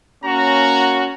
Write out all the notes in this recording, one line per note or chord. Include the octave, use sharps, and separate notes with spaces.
A#3 C#4 F#4 A#5